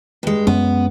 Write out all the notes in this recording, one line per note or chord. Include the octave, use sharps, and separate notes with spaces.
G2 G#3
F#2 G#3 B3 C#4